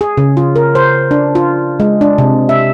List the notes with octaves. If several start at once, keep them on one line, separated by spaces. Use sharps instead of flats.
G#4
C#3
F4
A#4
C5
D4
F4
G#3
D4
C3
E5